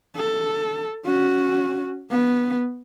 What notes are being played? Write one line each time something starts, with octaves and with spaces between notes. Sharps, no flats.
A4
C#4 F#4
B3